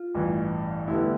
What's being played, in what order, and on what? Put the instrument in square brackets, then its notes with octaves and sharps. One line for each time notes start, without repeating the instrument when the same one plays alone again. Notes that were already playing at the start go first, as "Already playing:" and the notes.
Already playing: [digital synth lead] F4
[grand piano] A1 G2 E3
[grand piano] D2 D3 G3 B3 [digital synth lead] E4